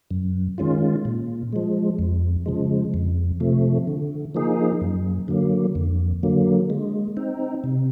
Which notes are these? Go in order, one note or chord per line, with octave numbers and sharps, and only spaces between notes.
F#2
D#3 G#3 C#4 F4
A#2
F3 G#3
F2
C#3 F3 G#3
F2
C3 F3 A3
D3
F3 A#3 D#4 G#4
F#2
D3 F#3 A#3
F2
D3 F#3 A#3
G#3
C4 D#4
C3